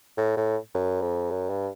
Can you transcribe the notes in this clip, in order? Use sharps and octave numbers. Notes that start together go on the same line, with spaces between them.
A2
A2
F#2
F2
F#2
G2